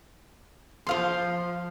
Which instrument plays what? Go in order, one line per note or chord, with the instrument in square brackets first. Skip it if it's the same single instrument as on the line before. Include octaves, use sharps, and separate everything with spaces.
[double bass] F3 [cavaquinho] C5 F5 C6